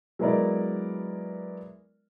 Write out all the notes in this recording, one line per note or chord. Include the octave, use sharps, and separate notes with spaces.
F#3 G#3 B3 E4 A#4 D5